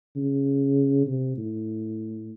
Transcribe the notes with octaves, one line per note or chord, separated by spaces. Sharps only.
C#3
C3
A2